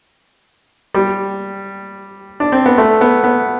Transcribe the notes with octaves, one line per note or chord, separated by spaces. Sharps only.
G3
D4
C4
B3
A3
B3
B3